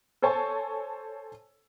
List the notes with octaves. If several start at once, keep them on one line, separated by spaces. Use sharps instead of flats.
A4 C5 C#5 G#5 A5 C#6